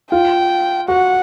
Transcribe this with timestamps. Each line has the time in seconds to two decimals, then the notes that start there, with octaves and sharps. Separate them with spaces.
0.11 F4 G5
0.88 F#4 F#5